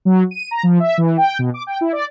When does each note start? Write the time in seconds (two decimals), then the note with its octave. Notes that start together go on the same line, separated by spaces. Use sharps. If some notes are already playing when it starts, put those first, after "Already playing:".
0.05 F#3
0.31 D#7
0.51 A#5
0.63 F3
0.80 E5
0.98 E3
1.17 G5
1.39 B2
1.54 D6
1.67 G5
1.81 E4
1.93 D5